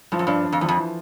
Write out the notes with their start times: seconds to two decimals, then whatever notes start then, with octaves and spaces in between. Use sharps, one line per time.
0.12 G2 F3
0.19 F#2
0.27 G2 D4
0.44 D4
0.53 F2
0.61 E2 F3
0.69 F2
0.77 E3